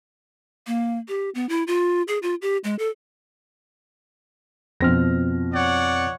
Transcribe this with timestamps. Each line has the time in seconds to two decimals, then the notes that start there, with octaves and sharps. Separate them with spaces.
0.67 A#3
1.08 G4
1.35 B3
1.49 E4
1.67 F4
2.08 G#4
2.22 F4
2.42 G4
2.64 G#3
2.79 A4
4.81 F2 B2 F3 C4 F6 A#6
5.53 C#5 D5 F#5